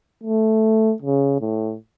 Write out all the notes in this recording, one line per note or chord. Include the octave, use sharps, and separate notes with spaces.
A3
C#3
A2